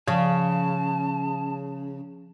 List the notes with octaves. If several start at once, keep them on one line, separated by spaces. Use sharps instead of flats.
C#3 F3 F5 A5